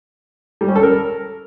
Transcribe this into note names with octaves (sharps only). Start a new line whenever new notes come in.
G3
C#4
A4
A#4